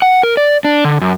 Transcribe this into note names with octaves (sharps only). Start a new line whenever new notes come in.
F#5
A#4
D5
D4
D3
F#2